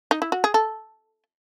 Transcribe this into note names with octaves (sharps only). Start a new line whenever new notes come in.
D#4
E4
F#4
G#4
A4